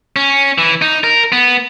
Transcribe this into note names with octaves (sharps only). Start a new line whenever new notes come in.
C#4
E3
D#4
A#4
B3